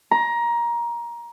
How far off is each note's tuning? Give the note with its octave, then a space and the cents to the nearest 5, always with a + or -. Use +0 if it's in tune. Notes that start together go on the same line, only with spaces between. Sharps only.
A#5 +20